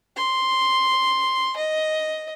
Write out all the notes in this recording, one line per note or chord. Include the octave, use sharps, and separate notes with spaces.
C6
D#5